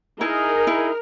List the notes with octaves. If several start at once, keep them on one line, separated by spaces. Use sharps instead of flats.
D#4 E4 G#4 A#4
E4